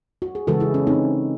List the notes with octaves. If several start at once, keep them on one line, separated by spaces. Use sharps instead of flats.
F#4
G#4
C#3 E3 G#3 F#4 A4
E4 G#4
C#4
C4 D#4